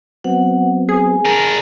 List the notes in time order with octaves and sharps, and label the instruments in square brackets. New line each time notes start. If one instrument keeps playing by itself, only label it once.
[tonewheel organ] F#3 B3 C4 [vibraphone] F#5
[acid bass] G#4 [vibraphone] G#5
[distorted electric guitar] D4 A#4